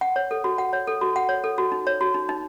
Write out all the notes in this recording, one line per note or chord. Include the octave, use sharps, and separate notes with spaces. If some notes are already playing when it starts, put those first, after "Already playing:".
F#5
C#5
A4
F#4
F#5
C#5
A4
F#4
F#5
C#5
A4
F#4
D#4
C#5
F#4
D#4
D#4